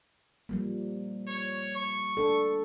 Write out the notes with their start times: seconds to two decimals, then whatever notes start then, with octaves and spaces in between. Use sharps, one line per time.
0.49 F3 G3 A#3
1.28 C#5
1.76 C#6
2.17 D4 A4